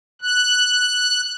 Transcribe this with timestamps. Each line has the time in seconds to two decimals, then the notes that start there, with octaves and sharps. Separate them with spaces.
0.22 F#6